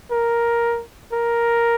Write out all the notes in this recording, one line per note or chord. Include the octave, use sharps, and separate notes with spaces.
A#4
A#4